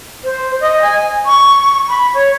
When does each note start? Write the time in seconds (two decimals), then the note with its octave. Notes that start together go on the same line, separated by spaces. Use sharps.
0.24 C5
0.61 D#5
0.82 G#5
1.26 C#6
1.89 B5
2.14 C#5